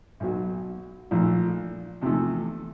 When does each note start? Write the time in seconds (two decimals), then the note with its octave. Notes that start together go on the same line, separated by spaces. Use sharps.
0.20 B1 B2 F#3
1.11 A#1 A#2 F3 A3
2.02 E2 C3 F3 A3